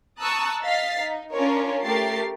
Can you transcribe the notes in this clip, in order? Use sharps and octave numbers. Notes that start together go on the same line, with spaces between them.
A5 A#5 C#6 D#6 E6 F#6
D#5 F5 A6 B6 C7
D#4
C#4 D4 F4 A#4 C#5
A3 G4 A#4 A6 C7